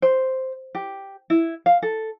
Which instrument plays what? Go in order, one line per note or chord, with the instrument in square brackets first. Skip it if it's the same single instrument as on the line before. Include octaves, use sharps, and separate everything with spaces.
[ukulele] C5
G4
E4
F5
A4